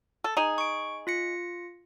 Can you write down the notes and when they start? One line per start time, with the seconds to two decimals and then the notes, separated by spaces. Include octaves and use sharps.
0.24 A4
0.37 D#4 G#4
0.58 C#6 D7
1.07 F4 A#6 C#7